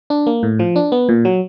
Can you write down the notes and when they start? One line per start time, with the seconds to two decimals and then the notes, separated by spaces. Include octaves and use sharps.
0.10 D4
0.27 A#3
0.43 A2
0.59 F3
0.76 D4
0.92 B3
1.09 A#2
1.25 F#3